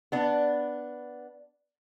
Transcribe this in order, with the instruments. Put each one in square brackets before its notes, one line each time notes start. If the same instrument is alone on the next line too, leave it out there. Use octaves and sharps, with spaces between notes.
[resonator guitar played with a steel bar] B3 D4